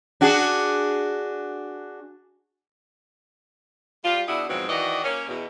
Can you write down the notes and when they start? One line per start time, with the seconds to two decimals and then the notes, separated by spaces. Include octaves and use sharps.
0.21 D4 F#4 G#4
4.04 G3 F4
4.28 B2 D4 E4 F#4 G#4
4.49 G#2 B2 F3 F#3 C4
4.68 D#3 E3 F#4 D5 D#5
5.04 A#3 C#4
5.27 E2 B2